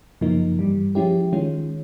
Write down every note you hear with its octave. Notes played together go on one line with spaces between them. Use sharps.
F#2 C#3 F3 A#3 D#4
G2 E3 G3
F3 G#3 C#4 E4 G4
D#3 G#3 C#4 F4